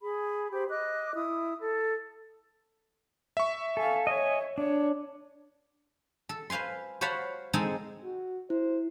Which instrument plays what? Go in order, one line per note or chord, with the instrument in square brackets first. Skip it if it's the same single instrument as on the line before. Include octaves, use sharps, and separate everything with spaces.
[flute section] G#4 B5
G4 C5 B5
D#5 D6 F#6
E4 D#6
A4
[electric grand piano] E5 C#6
[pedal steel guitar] A4 [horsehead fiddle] F5 G#5
[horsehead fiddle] C#5 [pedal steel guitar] D#5 G#5
[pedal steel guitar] D4 [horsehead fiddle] C#5
[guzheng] A4
B4 C5 F5 G#5 C6
C5 C#5 F5 F#5 A5 B5
G#3 C4 D#4 A4 G#5
[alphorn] F#4
[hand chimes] E4 [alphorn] C5